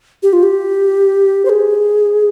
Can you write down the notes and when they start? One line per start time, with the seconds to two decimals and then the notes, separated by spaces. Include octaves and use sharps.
0.23 G4
0.33 F4
0.43 G4
1.45 C5
1.49 G#4